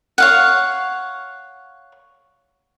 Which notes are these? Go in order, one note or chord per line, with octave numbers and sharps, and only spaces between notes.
C#5 F5 F#5